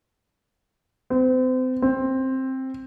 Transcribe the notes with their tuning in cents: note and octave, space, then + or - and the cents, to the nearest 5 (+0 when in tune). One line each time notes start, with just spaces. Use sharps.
C4 -35
C4 +10